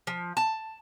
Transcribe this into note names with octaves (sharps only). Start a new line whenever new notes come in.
F3
A5